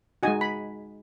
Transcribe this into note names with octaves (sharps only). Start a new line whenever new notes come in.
G#3 D#4 F#4 D#5 G#5
B5